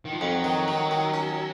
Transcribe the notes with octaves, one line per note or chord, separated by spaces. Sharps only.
D#3
F3
F2 F#3
D#3
D#3
D#3
C#4